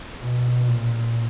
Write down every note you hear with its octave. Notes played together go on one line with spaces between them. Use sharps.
B2
A#2